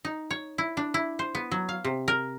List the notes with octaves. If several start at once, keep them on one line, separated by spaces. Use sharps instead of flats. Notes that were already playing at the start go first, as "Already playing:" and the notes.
D#4
C#5
E4
D4
E4
C5
B3
F#3
F5
C3
A#4